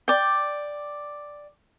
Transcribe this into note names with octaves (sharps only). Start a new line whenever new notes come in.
D5 G5